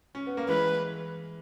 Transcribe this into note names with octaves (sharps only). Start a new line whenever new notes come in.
C#4
B3
A#3
E3 G#3 B4